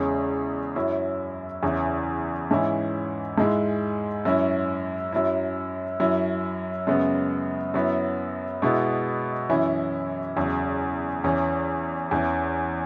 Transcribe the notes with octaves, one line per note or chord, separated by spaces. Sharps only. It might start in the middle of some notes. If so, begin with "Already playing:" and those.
Already playing: E2 C#3 G#3
F#2 F#3 C#4 E4
E2 C#3 E3
G#2 E3 C#4 E4
G#2 G#3 E4
F#2 F#3 C#4 E4
F#2 F#3 E4
F#2 F#3 C#4 E4
F#2 C#3 G#3 B3
F#2 F#3 B3 E4
B2 G#3 B3 E4
F#2 E3 C#4 E4
E2 C#3 F#3
E2 E3 C#4
E2 E3 C#4